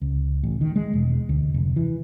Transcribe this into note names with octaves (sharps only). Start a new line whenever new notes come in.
C#2
A1
D#3
G#3
E1
D2
F1
E3